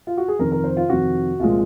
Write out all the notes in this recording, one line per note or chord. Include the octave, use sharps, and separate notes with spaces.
F4
F#4
G#4
F2 C3 D#3 A#4
A#4
C5
F4
F2 C3 D#3 F#4
C2 A#2 F3 G#3 F4